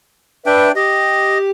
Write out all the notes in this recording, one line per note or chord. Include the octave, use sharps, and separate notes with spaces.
D4 B4 E5 G5
G4 D#5